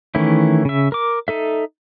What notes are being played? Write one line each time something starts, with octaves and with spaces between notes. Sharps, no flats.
D#3 E3 A3 C#4 E4
C#3 E5
A#4 D6
D#4 A4 E5